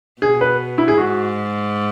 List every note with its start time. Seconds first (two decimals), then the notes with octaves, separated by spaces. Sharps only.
0.22 B2 G#4
0.41 B4
0.78 E4
0.88 G#4
0.97 G#2 F#4